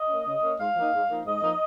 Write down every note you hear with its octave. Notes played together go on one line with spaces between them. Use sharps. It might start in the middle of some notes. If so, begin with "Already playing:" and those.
Already playing: D#5
A#3 C#4
C#3
A#3 C#4
G#2 F5
F3 A#3 D#4
G#2
F3 A#3 D#4
G#2 D#5
F3 A#3 D#4